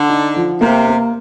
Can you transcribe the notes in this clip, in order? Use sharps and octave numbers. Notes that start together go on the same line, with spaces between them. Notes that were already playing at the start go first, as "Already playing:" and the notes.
Already playing: D3
D#4
F3
C3 A#3
A#3